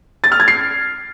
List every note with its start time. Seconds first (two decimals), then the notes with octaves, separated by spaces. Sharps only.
0.24 A6
0.32 F6
0.40 G#6
0.48 C7